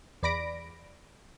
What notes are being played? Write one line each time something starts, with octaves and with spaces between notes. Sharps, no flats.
E2 D5 B5 A#6 D7